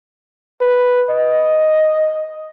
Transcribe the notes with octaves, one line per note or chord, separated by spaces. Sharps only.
B4
D#5